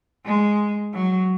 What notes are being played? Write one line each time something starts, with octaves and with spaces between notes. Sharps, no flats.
G#3
F#3